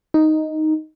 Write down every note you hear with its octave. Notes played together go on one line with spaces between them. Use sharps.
D#4